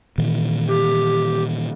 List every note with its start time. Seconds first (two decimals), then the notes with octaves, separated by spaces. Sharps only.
0.18 A#2 D#3 E3
0.68 G4